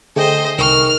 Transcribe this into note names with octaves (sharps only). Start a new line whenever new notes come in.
D3 A3 G#4 C5 D#5 G5
C2 D#3 C#6 F6